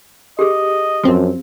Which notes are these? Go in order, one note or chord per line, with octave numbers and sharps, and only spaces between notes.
G4 G#4 D#5
F#2 F3 C4